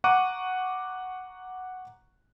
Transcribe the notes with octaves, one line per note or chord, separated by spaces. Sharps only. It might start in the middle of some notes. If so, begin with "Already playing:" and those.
F#5 A#5 C#6 D6 F#6 D#7